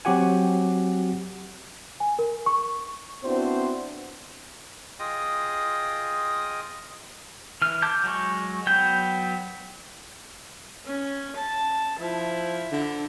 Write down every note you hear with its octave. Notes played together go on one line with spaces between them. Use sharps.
F#3 C4 F#4 G4 F#5 G#5
G#5
A#4
C#6
B3 C4 D4 E4 F#4 C5
F4 G#4 D#5 G5 D#6
E3 F6
A5 D6 G6
F#3 G#3 C#6
F#3 B3 G5 G6
C#4
A5
F3 E4
D3